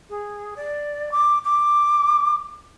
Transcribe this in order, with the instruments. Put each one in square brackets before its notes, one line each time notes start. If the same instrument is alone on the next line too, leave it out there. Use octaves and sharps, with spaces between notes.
[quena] G#4
D5
D6
D6